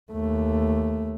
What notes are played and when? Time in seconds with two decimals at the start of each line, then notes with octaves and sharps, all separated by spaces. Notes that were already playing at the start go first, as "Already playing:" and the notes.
0.12 D#2 A3